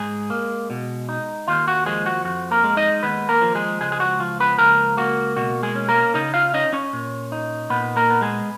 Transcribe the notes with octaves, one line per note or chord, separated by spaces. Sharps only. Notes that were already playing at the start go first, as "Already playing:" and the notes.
Already playing: G#2 G#3 G#4
A#3
B2
D#4
D#2 F4
F#4
F3 G#3 G#4
F#4
F2 F#4
A#3 A#4
G#3
D#4 D#5
D#2 B3 B4
A#3 A#4
F3
G#3 G#4
C#2 G#3 G#4
G#4
F#4
F3 F4
B3 B4
C#2 A#3 A#4
A#3 F#4
B2 F#4
G#3 G#4
C#4
A#3 A#4
C#3 D#4 D#5
F4 F5
C#4 D#4 D#5
C#4 C#5
A#2
D#4
A#2 B3 B4
A#3 A#4
B3
G#3 G#4